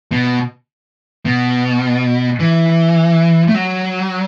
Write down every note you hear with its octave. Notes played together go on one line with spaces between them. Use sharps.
B2
B2
E3
A3
F#3